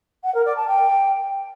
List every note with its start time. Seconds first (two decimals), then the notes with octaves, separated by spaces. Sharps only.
0.23 F#5
0.34 A#4
0.45 D5
0.56 A5
0.67 G5